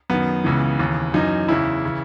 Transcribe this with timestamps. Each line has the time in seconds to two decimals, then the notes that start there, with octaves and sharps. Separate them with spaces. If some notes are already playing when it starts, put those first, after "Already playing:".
0.10 F#2 D#3 B3
0.44 C#2 C#3 E3
0.79 D#2 C#3 E3
1.14 F#2 E3 D#4
1.48 E2 C#3 E3 E4
1.85 C#3 E3